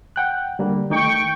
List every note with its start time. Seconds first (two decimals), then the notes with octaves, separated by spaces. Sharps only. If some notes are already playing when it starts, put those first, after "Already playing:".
0.16 F#5 G5 F#6
0.59 D3 G3 A#3
0.90 D#3 A3 D#4 G5 C#6